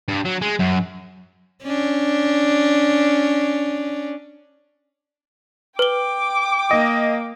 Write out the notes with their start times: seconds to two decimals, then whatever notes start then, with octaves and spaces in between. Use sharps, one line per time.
0.09 G2
0.25 F#3
0.42 G#3
0.59 F#2
1.63 C#4 D4
5.79 B4 G5 D6 G7
6.71 A#3 D#5